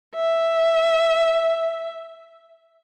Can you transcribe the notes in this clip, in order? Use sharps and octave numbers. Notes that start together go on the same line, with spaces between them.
E5